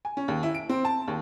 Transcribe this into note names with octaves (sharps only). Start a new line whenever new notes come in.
G#5
C#4
D#2
E4
D7
C4
A5
D#2